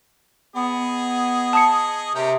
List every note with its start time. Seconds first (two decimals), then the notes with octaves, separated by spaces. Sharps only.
0.56 B3 G#4 D#5
1.53 A5 D#6 C#7
2.15 C3 C#4 A#4 G5